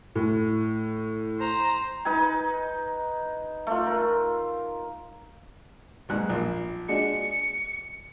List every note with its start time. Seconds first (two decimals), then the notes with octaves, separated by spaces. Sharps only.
0.15 A2
1.39 C5 A#5
2.05 D#4 B4 G#5
3.67 A3 F4
3.86 A#4
6.09 B1 G#2 F#6
6.29 A#1
6.89 G#3 D4 F#4 C#7